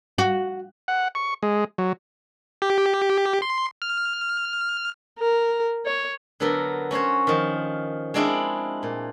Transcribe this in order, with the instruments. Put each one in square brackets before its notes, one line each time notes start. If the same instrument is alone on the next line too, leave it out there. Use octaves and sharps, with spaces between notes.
[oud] F#4
[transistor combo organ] F#5
C#6
G#3
F#3
[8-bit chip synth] G4
C6
F6
[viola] A#4
C#5
[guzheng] D3 F#3 B3 A4 A#4
C#4 F#4 C5 C#5
D#3 F3
G#3 C4 D4 E4 F4 G#4
A#2